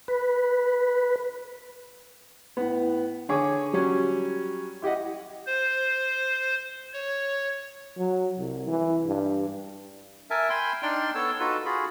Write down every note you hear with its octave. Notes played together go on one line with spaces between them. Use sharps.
B4
A2 B3
D3 G#4 C#5 D6
F#3 G3 C#4
E4 G4 D#5 F#5
C5
C#5
F#3
C2
E3
G2
A#4 E5 G#5 A5
G5 G#5 B5 C6
D4 D#4 D5 G5 C6 F6
B3 A4 C#5 A5 E6
D#4 F4 F#4 A4 B4
F4 F#4 G#4 B5